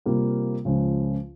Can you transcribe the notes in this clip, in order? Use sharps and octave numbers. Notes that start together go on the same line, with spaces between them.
C3 G3 A#3 F4
C#2 C#3 F3